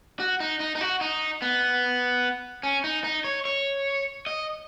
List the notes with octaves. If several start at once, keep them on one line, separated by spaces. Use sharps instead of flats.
F#4
D#4
D#4
D#4
F#4
D#4
B3
C#4
D#4
D#4
C#5
C#5
D#5